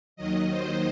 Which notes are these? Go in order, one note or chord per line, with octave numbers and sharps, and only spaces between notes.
D#2 D#3 F#3 D#5
C5